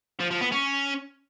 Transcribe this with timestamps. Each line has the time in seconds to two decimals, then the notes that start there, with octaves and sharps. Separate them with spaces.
0.20 F3
0.31 F3
0.41 B3
0.52 C#4